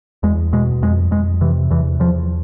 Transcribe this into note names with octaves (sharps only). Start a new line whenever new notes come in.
E2 G#3
B2 G#3
F2 G#3
F2 G#3
C3 E3
E2 E3
E2 F3